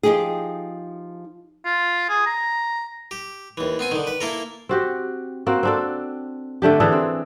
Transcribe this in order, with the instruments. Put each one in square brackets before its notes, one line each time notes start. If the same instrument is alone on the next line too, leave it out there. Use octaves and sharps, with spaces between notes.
[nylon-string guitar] F3 D#4 G4 G#4
[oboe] F4
G#4
A#5
[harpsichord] G4
D#2 E3
B3 C4 G#5
D3 D#3
B4
A#3 E4 A4 A#4
[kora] C4 F#4 G4
A#3 C4 F#4
C4 D4 A4
D3 A3 D4 G4
E3 D4 G#4 A4
C4